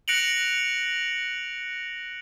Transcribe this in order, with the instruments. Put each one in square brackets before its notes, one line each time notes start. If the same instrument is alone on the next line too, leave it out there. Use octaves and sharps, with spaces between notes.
[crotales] F#6 A#6 C#7 D7 F7 F#7